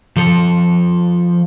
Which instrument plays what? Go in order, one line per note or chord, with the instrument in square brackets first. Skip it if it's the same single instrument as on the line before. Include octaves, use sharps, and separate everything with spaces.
[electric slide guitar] F3 A4